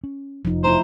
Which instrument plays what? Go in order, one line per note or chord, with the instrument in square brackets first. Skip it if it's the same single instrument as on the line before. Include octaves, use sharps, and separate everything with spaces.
[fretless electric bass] C#4
[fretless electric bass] F1 [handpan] F3 D#4
[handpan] A3 E4 [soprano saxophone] C5 [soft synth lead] A#5